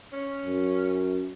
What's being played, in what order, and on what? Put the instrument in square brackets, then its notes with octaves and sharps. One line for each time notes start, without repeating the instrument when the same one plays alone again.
[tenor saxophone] C#4
[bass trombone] F#2